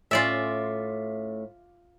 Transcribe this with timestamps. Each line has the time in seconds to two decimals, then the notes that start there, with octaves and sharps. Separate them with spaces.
0.11 A2 C#4 F4 D5 E5